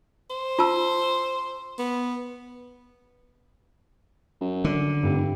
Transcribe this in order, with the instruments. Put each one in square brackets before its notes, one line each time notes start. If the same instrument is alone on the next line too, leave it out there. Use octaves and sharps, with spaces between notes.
[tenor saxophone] C5
[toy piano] F4 A5 E6
[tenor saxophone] B3
[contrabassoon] F#2
[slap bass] D3
[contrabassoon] F1 [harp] G2 G3